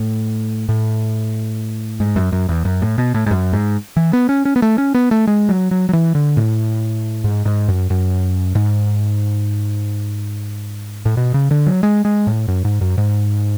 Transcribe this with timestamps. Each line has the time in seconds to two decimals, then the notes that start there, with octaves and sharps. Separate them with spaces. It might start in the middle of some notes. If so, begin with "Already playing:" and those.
Already playing: A2
0.69 A2
2.00 G#2
2.16 F#2
2.32 F#2
2.49 E2
2.65 F#2
2.82 A2
2.98 B2
3.14 A2
3.26 G#2
3.31 F#2
3.53 G#2
3.97 E3
4.13 B3
4.29 C#4
4.45 C#4
4.56 B3
4.62 A3
4.78 C#4
4.94 B3
5.11 A3
5.27 G#3
5.49 F#3
5.71 F#3
5.89 F#3
5.93 E3
6.15 D3
6.37 A2
7.24 G#2
7.45 G#2
7.68 F#2
7.90 F#2
8.55 G#2
11.06 A2
11.17 B2
11.34 C#3
11.51 D3
11.66 F#3
11.83 G#3
12.05 G#3
12.27 A2
12.48 F#2
12.65 G#2
12.81 F#2
12.98 G#2